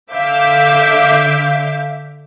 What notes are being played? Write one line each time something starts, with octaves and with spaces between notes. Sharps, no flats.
D3 E5 F5 D6 G6